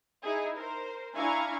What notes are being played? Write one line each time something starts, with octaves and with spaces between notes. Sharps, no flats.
D#4 E4 G#4
A#4 C5
D4 E4 F5 G#5 A#5 C#6